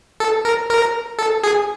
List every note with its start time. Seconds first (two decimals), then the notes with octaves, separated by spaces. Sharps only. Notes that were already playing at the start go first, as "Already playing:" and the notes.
0.20 A4
0.45 A#4
0.70 A#4
1.19 A4
1.44 G#4